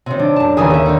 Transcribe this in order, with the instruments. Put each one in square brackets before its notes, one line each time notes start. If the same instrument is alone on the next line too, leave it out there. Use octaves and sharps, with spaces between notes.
[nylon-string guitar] C3 D#3 [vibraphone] C#5 C6
[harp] D4
[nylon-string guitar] F#2 A5
[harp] D#2 D#6 G#6 [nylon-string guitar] C#3 E3 G#4
[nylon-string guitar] D3 E5
D3 D#3